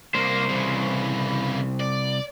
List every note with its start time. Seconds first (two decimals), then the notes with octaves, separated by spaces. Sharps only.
0.15 C2 A#3 C5
0.49 C#3 E3
1.80 D5